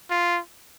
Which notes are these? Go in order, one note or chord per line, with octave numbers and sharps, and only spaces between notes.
F4